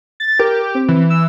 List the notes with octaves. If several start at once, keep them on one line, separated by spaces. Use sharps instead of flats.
A6
G4 A#4
C4
E3
E6